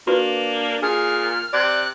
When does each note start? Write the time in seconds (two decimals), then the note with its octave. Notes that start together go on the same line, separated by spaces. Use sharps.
0.07 A#3 D4 F#4 B4
0.83 A#2 G#4 F6
1.53 C3 D5 F#6